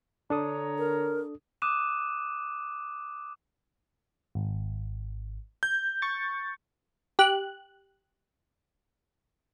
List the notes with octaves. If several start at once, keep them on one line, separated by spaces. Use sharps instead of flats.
D3 D4 A4 C#5 A#5 D#6
A#4
D6 D#6 F#6 D#7 E7
G#1
G6
C#6 A6
G4 F#6